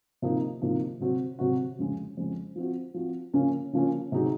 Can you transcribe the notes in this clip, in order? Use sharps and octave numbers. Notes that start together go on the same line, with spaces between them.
C3 F3 A#3 D#4
C3 F3 A#3 D#4
C3 F#3 C4 F#4
C3 F#3 C4 F#4
F2 C#3 G#3
F2 C#3 G#3
F3 C4 F#4
F3 C4 F#4
C#3 F3 A#3 C#4
C#3 F3 A#3 C#4
C3 F#3 C4 D#4 G#4